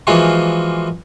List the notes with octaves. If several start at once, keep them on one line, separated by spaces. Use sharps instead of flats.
E3 F3 G#3 A#3 F4 F#4